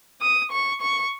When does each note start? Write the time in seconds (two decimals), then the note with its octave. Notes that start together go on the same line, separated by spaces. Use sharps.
0.22 D#6
0.52 C#6
0.81 C#6